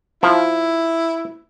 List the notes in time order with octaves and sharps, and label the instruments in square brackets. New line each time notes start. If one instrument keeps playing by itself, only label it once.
[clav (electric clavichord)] F3 [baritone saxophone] E4